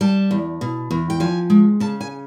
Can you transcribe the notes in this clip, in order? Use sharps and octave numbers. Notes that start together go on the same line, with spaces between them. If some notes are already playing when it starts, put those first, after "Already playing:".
G3 A5
E2
B2
E2
G5
F3 G#5
G#3
C#3 A5
G#5